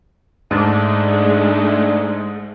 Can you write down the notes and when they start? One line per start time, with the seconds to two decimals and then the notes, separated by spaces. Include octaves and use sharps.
0.51 G#2 G#3 A3 D4